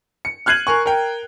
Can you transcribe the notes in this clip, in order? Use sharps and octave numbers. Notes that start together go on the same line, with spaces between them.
C#7
F6 F#6 G#6 C7 D#7 F#7
A#4 G#5 C#6
A#4 G5